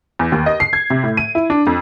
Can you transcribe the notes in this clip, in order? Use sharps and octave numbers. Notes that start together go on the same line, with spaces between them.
E2
D#2
D#5
C7
G#6
C3
A2
D#7
E4
D4
F2